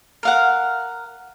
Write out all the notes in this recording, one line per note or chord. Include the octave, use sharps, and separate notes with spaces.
A#4 F5 F#5